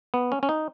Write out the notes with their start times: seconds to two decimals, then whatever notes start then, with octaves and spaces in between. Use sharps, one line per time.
0.14 B3
0.32 C#4
0.43 C#4
0.49 D#4